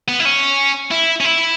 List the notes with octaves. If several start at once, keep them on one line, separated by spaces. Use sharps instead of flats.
B3
E4
C#4
E4
C#4
E4